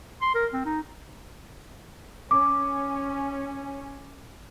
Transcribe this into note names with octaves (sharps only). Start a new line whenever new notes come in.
C6
A#4
C4
D#4
C#4 D6